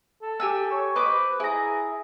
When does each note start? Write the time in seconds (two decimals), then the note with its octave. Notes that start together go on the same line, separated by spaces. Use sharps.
0.22 A4
0.40 G4 G#5 E6
0.71 C#5
0.96 B4 C5 D#5 D6
1.40 E4 G#4 A#5